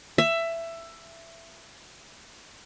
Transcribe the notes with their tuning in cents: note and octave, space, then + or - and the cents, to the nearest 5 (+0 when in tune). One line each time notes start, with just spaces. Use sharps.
E5 +15